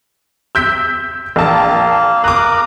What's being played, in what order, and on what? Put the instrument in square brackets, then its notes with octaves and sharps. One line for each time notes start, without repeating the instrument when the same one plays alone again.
[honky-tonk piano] E6 G6 B6
[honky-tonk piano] A#1 A5 [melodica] A#3 F5
[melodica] A#4 A#5 D#6 [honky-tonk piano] D6 F#6